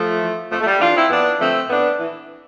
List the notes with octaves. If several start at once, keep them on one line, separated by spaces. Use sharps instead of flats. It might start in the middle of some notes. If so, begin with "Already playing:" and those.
Already playing: F3 A3
E3
F2 F3 A3
A3
G3
E3 D4 F4
C4 E4
F2 B3 D4
D3 F3 A3 C4
A2 B3 D4
E3